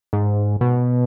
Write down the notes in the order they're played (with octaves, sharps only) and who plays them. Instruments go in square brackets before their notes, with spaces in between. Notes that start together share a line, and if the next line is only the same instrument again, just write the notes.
[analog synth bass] G#2
B2